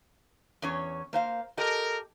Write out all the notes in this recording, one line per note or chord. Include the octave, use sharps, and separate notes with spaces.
E2 C#4 C#5
A#3 C5 F5
G4 A4 A#4 D#5